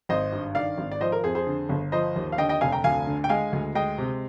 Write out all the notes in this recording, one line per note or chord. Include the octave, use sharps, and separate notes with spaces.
G#1 C5 D#5
G2
D#3 D5 F5
G#1
D5
F3 C5 D#5
A#4
F2 G#4 C5
G#4 C5
D3
G1
F3 C5 D#5
D#2
F5
D3 D#5 G5
D#5 G5
F1 F5 G#5
G5 A#5
D2 F5 G#5
D3
G5
G#3 F5 G#5
D2
G#3 D#5 G5
C3